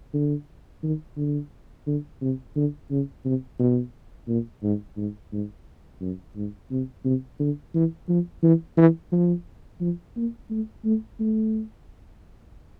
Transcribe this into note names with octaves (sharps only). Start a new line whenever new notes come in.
D3
D#3
D3
D3
C3
D3
C#3
C3
B2
A#2
G#2
G#2
G#2
F#2
G#2
C3
C3
D3
E3
F3
E3
E3
F3
F3
A#3
A3
A3
A3